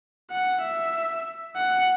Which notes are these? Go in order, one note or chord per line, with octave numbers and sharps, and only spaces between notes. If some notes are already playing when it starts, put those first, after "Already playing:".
F#5
E5
F#5